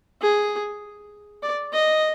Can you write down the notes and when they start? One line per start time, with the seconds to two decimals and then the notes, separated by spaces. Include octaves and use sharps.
0.22 G#4
1.42 D5
1.73 D#5